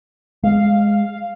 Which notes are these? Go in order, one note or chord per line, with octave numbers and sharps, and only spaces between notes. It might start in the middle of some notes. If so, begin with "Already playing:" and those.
G#3 F5